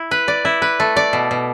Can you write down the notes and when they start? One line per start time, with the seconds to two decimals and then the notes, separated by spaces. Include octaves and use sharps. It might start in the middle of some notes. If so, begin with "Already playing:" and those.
Already playing: E4
0.11 B4
0.28 D5
0.45 E4
0.62 B4
0.80 A3
0.96 D5
1.13 B2
1.31 B2